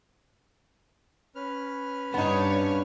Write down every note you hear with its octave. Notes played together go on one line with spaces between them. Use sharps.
C#4 B4 F6
G2 B3 D4 D#4 C#5